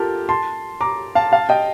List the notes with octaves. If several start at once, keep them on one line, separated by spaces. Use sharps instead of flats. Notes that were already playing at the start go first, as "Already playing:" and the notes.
Already playing: F4 G4 A4 A#4 A5
A5 C6
A#5 D6
F5 A5
F5 A5
D#5 G5